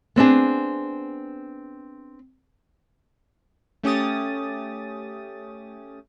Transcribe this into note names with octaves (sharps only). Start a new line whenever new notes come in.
B3 C4 D4 G#4
A3 C#4 G4 D#6 A6